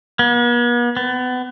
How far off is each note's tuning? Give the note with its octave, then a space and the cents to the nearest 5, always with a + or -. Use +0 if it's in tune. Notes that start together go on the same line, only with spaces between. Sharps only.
B3 -45
B3 +30